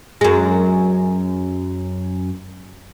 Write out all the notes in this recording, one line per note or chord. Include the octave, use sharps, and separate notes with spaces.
F#2 G#3